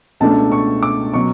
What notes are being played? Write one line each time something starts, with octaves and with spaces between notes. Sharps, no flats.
C#2 B2 A3 D4 A5
C#6
D6
B2 F#3 C#6